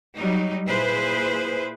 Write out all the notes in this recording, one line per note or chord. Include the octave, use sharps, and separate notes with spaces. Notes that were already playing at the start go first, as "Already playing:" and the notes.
F#3 G3 D#4
A#2 E4 G#4 B4 C5